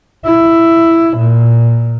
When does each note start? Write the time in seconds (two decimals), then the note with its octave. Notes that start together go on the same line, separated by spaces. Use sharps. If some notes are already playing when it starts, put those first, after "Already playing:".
0.25 E4
1.16 A#2